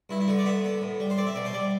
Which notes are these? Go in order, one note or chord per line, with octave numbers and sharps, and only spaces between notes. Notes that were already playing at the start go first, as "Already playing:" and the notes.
G2 E4
E4
D3 F#4
D5
B3 E5
B3
A2
G3
C5
C4 D5
E5
B2 D5
C5
G3 D5